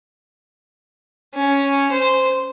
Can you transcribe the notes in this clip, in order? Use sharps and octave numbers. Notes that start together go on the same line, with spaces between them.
C#4
C5